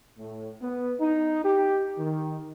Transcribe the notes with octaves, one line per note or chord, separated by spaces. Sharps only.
A2
B3
D#4
G4
D#3